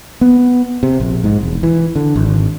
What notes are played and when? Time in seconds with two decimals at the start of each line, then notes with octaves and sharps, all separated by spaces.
0.21 B3
0.83 C3
1.00 A#1
1.24 G#2
1.43 E1
1.63 E3
1.96 D3
2.16 G#1